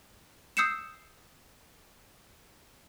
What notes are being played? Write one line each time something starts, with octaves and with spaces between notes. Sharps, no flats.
D#6 E6 G6 C7 C#7 E7